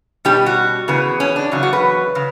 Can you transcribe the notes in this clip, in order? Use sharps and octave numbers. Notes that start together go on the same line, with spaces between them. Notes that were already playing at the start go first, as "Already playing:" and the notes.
B2 G3 C#4 G4
F#4
C#3 E3 B3
C#4
D4
E2 C#3 F#3
F#4
B4
C#3